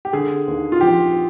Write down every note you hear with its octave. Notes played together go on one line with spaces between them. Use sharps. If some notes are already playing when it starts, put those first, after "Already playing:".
G4
D3 G#4
D#2
F4
F3 G4